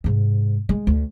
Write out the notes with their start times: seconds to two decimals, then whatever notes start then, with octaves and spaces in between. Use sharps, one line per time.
0.04 G#2 C3
0.69 G#3
0.87 D2